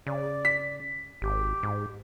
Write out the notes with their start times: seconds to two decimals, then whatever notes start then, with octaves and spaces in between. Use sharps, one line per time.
0.07 C#3 D5
0.45 B6
1.22 G#1 G4
1.63 G#2